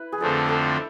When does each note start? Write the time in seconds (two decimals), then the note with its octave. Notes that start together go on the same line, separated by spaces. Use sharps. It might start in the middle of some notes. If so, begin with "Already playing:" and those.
Already playing: E4 B4
0.12 G#4
0.20 F2 D3 A3 C4 A4
0.48 A4